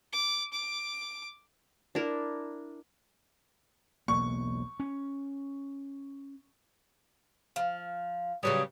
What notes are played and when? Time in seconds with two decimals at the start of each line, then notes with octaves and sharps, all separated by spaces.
0.13 D6
0.53 D6
1.95 D4 E4 A#4
4.08 E1 B1 A#3 C#6
4.80 C#4
7.56 F3
8.43 C#3 F#3 G3 G4 B4 C#5 D#6